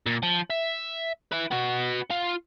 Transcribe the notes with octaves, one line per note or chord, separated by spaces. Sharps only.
A#2
F3
E5
E4 B4
B3 F#4
F4